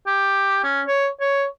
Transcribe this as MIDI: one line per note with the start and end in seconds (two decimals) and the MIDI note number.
0.07 0.60 67
0.64 0.82 61
0.87 1.08 73
1.20 1.44 73